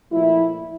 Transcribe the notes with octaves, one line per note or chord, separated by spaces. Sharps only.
A#2 F3 A3 E4